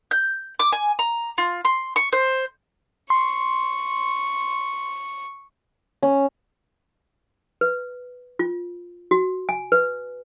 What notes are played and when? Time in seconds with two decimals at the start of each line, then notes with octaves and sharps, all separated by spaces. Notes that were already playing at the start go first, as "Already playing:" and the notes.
0.11 G6
0.59 D6
0.72 G#5
0.99 A#5
1.38 F4
1.65 C6
1.96 C#6
2.13 C5
3.10 C6 C#6
6.02 C#4
7.61 B4
8.39 F4
9.11 F#4
9.49 G#5
9.72 B4